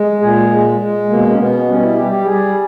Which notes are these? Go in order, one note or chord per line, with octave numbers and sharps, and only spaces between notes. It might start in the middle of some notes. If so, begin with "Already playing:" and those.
Already playing: G#3
A#2 G#4
G#3
G#3
B2 A#3
C#4
B2 B3
G3 C#4
E4
G3 G4
G4
G3 G#4